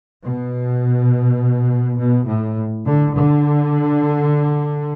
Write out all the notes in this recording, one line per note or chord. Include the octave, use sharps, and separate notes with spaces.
B2
B2
A2
D3
D3